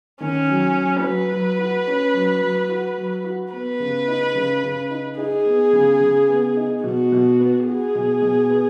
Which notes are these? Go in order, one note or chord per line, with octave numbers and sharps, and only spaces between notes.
D#3 C#4
F#3
F#3
F#3 B4
F#3
F#4
C#4
F#3
F#3
F#4
F#3
F#4
B3 B4
C#3
D#4
C#3
C#3
D#4
D#4 G#4
B3
C#3
C#3
B3
D#4
B2 F#4
B2
B3
F#4 G#4
B2
B2
B3